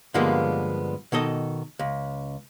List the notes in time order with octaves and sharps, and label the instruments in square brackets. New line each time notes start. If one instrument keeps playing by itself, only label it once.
[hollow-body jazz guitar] G2 D3 F3 G#3 A#3 B3
B2 D#3 A4 D#5
C#2